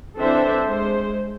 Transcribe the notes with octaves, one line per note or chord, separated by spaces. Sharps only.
E3 C4 D4 A4 C5 E5
G#3 C5